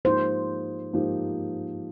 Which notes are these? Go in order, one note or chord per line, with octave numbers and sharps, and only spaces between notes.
G#2 F3 A#3 D#4 G4 C5
G#2 F3 A#3 D#4 G4